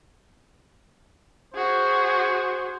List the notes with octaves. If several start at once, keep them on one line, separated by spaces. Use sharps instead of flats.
F#4 G#4 C5